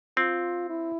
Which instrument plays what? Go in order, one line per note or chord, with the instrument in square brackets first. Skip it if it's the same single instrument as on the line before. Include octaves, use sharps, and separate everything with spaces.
[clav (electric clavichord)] C4 [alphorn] F4
[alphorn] E4